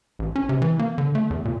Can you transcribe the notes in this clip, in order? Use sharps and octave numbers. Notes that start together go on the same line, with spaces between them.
A1
C#4
C3
E3
A#3
D3
A3
E2
A#2